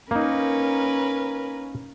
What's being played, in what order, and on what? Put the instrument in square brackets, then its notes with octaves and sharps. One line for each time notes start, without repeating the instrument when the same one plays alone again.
[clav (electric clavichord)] A#3 D#4 [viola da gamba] C#4 A#4 B4